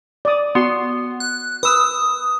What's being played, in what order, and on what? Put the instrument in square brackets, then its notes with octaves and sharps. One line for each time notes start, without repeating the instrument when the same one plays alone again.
[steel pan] D5 D#6
[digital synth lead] B3 [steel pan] F#4 C6
[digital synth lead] F#6
[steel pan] B4 E6 [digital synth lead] D#6